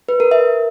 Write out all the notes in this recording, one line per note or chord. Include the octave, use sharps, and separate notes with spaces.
B4
A#4
E5